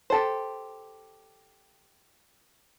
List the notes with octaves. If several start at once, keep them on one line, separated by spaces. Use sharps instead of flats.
G4 A4 C5